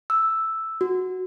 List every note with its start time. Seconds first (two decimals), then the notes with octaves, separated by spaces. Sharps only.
0.10 E6
0.81 F#4